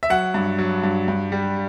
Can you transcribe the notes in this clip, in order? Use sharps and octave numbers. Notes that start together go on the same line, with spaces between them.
E5
F#3 F#5
G2
F#3
G2
G2
G3